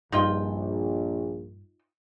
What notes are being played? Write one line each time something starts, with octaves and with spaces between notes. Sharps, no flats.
A#1 G2 D#4 F4 G5